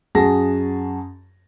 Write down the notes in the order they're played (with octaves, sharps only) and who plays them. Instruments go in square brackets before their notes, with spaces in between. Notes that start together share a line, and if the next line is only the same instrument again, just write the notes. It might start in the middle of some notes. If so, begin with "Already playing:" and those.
[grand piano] F#2 F#4 G#4 A5 A#6